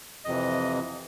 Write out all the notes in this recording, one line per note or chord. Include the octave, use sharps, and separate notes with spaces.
F2 C3 E3 D#5